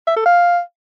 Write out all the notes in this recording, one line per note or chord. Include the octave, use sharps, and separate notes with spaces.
E5
A4
F5